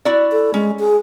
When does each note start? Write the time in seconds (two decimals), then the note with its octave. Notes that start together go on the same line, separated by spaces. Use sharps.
0.05 E4 F#4 D5
0.32 A4
0.54 G#3 C#4
0.79 G#4